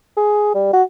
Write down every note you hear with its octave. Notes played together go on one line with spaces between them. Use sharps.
G#4
G3
F#4